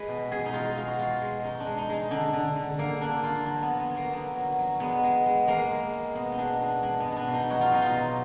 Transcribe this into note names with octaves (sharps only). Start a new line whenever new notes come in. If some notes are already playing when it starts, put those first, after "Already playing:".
Already playing: G#3 B4
B2
B2 G#4
D#4
G#3 F4
G#3 F4
F#4
G#3 F4
G#3
G#3 D#4
D4
G#3
D#4
G#3 D#4
D3 D4
D3
D3
D3 A#3
D3 D4
D3 F4
F#3 D4
B3
F#3
B3
F#3
A#3
D3 B3
F#3
F#3
G#3 B3
G#3
G#3
G#3 A#3
G#3
G#3
B2 B3
D#4
G#3 D4
B2 D4
G#3 D4
B3
B2
D4
B2
D#4
F#3 F#4
F4
B2 D#4
F4
F#3